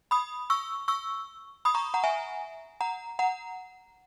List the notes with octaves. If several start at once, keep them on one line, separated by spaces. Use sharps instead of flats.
B5 D#6
C#6 E6
C#6 E6
B5 D#6
A#5 C#6
F#5 A#5
E5 G#5
F#5 A#5
F#5 A#5